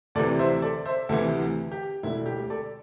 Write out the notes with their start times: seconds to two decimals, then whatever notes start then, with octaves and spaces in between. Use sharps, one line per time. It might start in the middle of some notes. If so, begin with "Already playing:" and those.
0.15 D2 C3 E3 A4 D5
0.39 C5 E5
0.62 A4 D5
0.86 C5 E5
1.09 D2 C3 E3 E4 A4
1.72 G4
2.03 E1 D2 D3 E4
2.26 G4
2.50 A4 D5